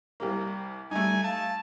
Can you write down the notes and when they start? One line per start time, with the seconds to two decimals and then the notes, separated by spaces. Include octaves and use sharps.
0.20 C2 G3 A#3
0.91 G3 A3 D#4 G#5
1.24 F5 A5